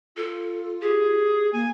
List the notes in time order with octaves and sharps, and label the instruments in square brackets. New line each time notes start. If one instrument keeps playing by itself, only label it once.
[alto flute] F4 [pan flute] A4
[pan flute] G4 [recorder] G#4
[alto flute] A#3 [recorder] G#5